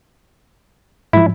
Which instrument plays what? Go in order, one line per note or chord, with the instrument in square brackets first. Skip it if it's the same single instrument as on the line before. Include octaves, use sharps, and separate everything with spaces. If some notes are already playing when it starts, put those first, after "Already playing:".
[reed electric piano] G#2 F3 [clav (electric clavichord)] E4